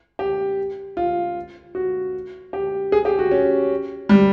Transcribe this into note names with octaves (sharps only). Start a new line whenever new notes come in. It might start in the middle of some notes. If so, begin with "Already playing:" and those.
G4
F4
F#4
G4
G#4
G4
F#4
C#4
G3